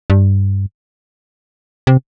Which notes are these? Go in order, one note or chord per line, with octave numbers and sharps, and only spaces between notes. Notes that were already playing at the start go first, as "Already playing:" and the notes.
G2
C3